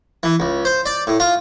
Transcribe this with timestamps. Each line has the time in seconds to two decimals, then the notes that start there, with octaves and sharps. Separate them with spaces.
0.23 E3
0.40 C#2
0.65 C5
0.86 D5
1.07 A2
1.20 F4